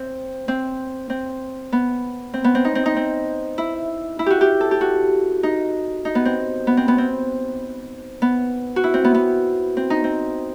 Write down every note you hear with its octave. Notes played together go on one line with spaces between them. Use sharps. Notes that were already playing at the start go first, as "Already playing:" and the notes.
Already playing: C4
C4
C4
B3
C4
B3
C4
D#4
C4
D#4
C4
E4
E4
F#4 G4
G4
A4
G4
F#4
D#4
D#4
B3
C4
B3
C4
B3
C4
B3
F#4
E4
C4
B3
B3
C4
D#4
C4